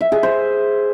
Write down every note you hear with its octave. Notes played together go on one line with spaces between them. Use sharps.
E5
G#4
C5